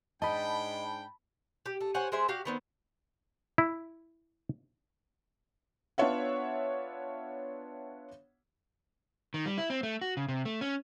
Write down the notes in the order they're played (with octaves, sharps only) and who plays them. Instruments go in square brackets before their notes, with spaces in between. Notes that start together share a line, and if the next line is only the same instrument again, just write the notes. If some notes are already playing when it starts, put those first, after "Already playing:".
[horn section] G#2 D4 G5 [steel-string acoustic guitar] D#5 [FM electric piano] A5 B5
[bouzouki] G4
A3
C5 C#5 F#5 G#5
G#3 G#4 C5 E5
F#4 G4 F5
D#3 B3 C4
[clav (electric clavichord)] E4
[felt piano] B3 D4 F4 C#5 E5 F#5
[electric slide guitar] D#3
G3
E4
C4
A3
F#4
C#3
C3
A3
C#4